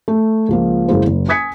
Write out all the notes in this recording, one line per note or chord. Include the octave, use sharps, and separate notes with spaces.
A3
C#2 F3 A#3
F#1 F#2 G#3 A#3 E4 C5
F#1
G#5 D#6 G#6 B6 C#7